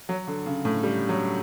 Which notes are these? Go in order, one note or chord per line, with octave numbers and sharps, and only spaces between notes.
F#3
D3
C#3
A2
G3
F#3